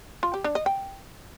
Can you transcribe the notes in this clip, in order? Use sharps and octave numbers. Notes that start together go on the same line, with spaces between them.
F4
G4
D4
D#5
G5